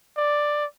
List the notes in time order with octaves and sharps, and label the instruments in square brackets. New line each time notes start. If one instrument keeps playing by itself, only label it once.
[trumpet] D5